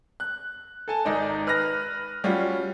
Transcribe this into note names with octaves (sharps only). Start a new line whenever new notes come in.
F#6
A4 G#5 A5
G#1 D#4 D5
B4 F6 F#6 A#6
G3 C#4 F4 F#4